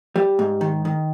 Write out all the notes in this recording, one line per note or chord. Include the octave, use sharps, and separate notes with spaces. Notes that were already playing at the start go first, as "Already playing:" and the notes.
G3
G#2
D#3
D#3